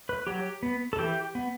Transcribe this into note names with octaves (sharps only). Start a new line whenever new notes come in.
B4
F#3 G4
B3
A4
E3 G4
B3